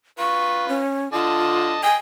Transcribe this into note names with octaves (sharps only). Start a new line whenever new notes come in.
F4 B4 C#6
C#4
D3 F4 D#5 A5
D#5 G5 G#5